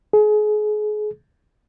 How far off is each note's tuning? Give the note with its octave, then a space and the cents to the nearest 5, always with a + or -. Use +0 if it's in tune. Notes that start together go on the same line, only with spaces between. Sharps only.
G#4 +30